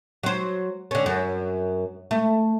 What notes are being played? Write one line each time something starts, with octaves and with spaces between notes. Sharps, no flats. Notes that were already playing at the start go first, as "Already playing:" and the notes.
F#3 C5
D3 C#4
F#2
A3